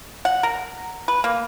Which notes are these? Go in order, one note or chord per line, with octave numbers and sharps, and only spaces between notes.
F#5
A#4
B4
A#3